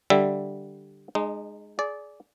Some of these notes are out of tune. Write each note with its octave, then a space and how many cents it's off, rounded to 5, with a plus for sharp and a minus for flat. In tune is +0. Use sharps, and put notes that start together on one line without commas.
D3 +0 G3 +0 E5 +0
G#3 +0 D#4 -30
G#4 +20 D5 -15